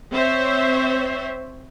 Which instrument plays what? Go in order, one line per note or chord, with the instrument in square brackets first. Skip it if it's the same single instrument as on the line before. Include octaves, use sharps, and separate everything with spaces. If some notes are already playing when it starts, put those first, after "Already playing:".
[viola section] C4 C5 C#5 E5